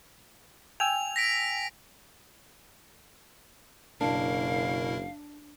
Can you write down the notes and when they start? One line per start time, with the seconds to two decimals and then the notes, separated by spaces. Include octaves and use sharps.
0.80 G5 G#5 E6 F7
1.16 A#6 B6 D7
4.01 F#1 B2 D4 E4 A#4 F5